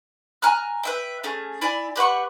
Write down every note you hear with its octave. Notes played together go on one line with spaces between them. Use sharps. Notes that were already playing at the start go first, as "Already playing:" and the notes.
G#5 A#5 F6 F#6
B4 E5 G5
A3 C#4 G#4
E4 D5 E5 G#5
G4 B4 F#5 C#6